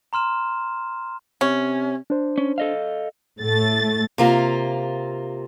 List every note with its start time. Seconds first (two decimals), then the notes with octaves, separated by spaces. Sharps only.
0.13 A#5 C6 F6 E7
1.41 C3 C#4
2.10 D4 C5
2.38 C#4
2.58 A4 D#5 F5
3.39 A2 A3 A6
4.18 C3 A#3 F4